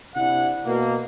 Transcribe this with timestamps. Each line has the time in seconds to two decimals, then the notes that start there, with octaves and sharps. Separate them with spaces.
0.15 C3 D4 E4 F#5
0.66 B2 A#3